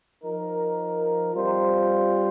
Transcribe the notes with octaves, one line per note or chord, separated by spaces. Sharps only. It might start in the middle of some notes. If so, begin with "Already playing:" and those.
F3 D#4 A#4
G3 C4 F4 C5